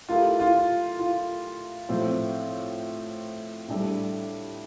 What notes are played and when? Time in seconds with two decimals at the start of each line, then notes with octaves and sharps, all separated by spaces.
0.09 A3 E4 F4 G4 A#4
0.40 F4
0.99 F4
1.89 A2 F3 C4
3.68 A2 G3 D4 A4